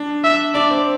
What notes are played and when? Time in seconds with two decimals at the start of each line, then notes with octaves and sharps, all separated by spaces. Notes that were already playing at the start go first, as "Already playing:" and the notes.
Already playing: D4
0.24 E5
0.54 D4 D5
0.70 C4